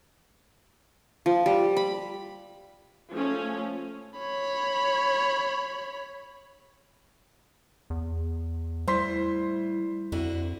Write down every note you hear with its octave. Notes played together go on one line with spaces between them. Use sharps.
F3
G3
B5
F3 A3 C#4 F4
C#5 B5
E2
A2 G3 C5 C6 B6
F2 D3 E4 F#4